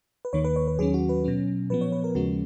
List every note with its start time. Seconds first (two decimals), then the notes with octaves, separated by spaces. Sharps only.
0.25 B4
0.33 D#2 D#3 A#3 C#5
0.44 B4
0.56 C#5
0.68 B4
0.79 D#2 D#3 F#3 C#4 G#4
0.94 F#4
1.09 B4
1.24 B2 F#3 C#4
1.70 A#2 F3 B3 B4
1.81 C#5
1.92 B4
2.04 A#4
2.15 D#2 C#3 F3 G#3 C#4 F#4